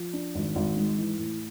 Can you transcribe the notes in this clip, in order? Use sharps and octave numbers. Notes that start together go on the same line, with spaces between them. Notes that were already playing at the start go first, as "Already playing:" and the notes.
Already playing: F3
D4
G#1
G#1
G#2
E3
A2